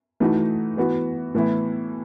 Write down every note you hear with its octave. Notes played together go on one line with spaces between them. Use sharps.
E3 A3 D#4 F#4
E3 B3 F#4
A2 E3 B3 E4